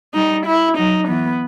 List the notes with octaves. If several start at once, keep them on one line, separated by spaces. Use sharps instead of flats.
G3 D#4
E4
F#3 D#4
E3 B3